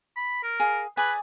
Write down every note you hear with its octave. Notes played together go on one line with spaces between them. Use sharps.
B5
A#4
G#4 F5
G#4 B4 D5 G#5